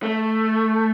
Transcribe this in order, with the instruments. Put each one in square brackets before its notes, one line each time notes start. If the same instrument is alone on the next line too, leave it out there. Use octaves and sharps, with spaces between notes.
[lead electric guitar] A3